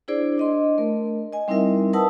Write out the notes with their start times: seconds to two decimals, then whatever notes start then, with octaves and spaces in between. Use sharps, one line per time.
0.08 D4 E4 G#4 C5 D5
0.38 D4 D#5 C6
0.78 A3 A#4
1.33 D#5 G#5
1.48 G3 C4 D#4 E4 A#4 E5
1.93 A#4 B4 F#5 A5 D#6 E6